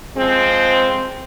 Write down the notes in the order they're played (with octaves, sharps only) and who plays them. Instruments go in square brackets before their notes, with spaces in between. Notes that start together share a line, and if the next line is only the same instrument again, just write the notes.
[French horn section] F3 G#3 C4